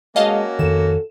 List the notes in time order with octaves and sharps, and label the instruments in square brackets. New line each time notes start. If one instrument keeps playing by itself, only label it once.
[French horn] G#3 [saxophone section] A#3 C#4 F#4 [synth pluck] D#5 F5 A5
[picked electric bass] F2 D#3 [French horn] A4 [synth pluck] E7